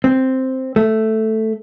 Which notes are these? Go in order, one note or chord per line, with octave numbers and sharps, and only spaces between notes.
C4
A3